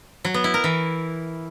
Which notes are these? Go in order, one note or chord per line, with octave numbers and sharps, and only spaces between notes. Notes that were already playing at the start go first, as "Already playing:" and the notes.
F#3
B3
E4
A#4
E3